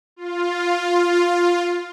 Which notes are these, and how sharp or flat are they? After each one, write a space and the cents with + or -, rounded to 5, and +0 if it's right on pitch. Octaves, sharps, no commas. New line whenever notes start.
F4 +5